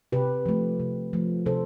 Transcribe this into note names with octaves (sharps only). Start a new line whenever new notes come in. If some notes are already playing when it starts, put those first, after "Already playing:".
C3 G4 B4
F3 A3
C3
F3 A3
C3 A4 C5